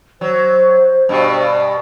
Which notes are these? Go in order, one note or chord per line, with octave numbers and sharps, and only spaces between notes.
F#3 C5
G2 B2